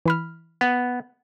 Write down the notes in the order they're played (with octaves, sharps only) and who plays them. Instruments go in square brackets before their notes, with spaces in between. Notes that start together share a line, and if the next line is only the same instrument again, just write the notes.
[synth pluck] E3 B5 F6
[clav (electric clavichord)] B3